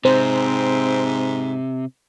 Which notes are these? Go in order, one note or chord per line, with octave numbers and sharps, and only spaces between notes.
G#2 C3 C4 C5